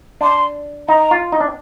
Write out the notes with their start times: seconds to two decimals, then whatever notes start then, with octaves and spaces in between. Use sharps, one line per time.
0.21 D4 C6
0.88 D#4 A#5
1.11 F4
1.32 D#4
1.41 D4